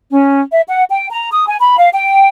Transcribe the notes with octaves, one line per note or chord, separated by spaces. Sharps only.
C#4
E5
F#5
G5
A#5
D#6
G#5
B5
F5
G5